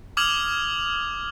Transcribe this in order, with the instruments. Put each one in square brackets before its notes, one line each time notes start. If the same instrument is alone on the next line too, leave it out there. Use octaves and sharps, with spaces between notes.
[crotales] D6 D#6 F6 G#6 F7 F#7